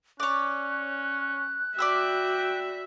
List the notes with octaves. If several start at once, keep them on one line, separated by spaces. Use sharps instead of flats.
C#4 C#5 D5 F#6
F#4 D5 E5 G5 B5 E6